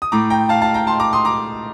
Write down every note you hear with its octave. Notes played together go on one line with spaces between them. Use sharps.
D#6
A2 A#5 D6
G5 A#5
F5 A5
F5 A5
G5 A#5
A5 C6
A#5 D6
C6 D#6
A#5 D6